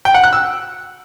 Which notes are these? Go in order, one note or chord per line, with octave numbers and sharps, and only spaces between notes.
G5
F#5
F#6
E6